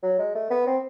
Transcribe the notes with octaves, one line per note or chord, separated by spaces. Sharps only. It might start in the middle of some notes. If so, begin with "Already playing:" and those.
F#3
G#3
A3
B3
C4